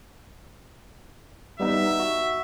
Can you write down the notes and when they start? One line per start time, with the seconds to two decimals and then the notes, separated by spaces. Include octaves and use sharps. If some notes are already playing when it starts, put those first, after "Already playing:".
1.60 G3 B3 D#4 E5
1.99 F#4